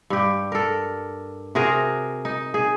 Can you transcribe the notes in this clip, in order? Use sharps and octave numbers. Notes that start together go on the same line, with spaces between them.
G2 G4
A4 A#4
C3 F#4 G#4 A#4
D#4
G#4